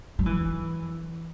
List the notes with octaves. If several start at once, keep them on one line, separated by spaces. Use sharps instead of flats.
F#3
E3